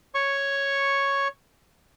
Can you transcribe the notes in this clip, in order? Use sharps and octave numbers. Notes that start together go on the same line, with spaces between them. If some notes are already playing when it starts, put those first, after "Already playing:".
C#5 C#6